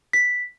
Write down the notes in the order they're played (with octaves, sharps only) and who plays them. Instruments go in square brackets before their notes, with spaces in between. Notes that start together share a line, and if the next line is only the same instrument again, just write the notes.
[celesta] B6